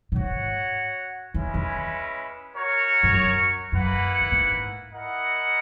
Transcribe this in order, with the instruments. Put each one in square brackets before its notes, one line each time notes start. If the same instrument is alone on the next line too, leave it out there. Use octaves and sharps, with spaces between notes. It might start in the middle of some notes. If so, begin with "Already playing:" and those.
[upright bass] A#2
[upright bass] G#2 [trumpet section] F#4 C#5 F#5
[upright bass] E2 [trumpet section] G#3 C#4 E4 B4
[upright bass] E2
[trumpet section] F#4 A#4 C#5
[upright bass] G#2
F#2
[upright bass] F#2 [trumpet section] A#3 E4 B4 F#5
[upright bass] F#2
G#2
[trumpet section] E4 A#4 D#5 F#5